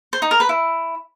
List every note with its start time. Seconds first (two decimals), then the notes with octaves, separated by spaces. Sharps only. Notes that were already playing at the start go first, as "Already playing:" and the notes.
0.13 C5
0.22 D#4
0.31 A#4
0.40 B4
0.49 E4